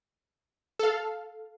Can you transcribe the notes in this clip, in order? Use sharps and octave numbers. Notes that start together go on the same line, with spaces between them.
A4 F5